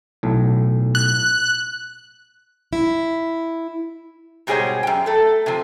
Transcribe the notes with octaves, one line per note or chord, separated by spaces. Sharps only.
B1 A2
F#6
E4
G#2 B2 G3 G#4 C5 C#5
F#2 G5
A3 A4
C3 F3